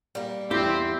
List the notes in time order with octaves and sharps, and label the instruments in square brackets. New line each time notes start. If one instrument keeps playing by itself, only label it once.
[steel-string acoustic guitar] G3 A#3
[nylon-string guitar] E2 E4 [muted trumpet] C4 [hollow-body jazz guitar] G4